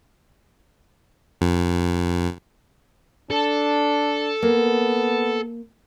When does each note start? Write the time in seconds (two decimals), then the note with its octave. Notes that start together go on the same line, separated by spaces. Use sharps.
1.41 F2
3.30 D4 A4
4.42 A#3 B3